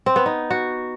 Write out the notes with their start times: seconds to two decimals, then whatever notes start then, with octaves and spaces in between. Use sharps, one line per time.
0.06 C4
0.16 B3
0.26 D#4
0.50 F#4